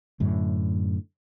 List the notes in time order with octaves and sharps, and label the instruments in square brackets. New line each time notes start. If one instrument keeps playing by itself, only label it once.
[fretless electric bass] F#2 A2 D3